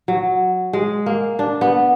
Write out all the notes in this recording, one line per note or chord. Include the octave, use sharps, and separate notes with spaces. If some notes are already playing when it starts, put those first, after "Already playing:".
F#3
G#3
A#3
D4
B3